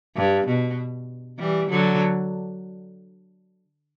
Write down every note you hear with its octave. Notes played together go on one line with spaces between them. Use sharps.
G2
B2
E3 G3
D3 F#3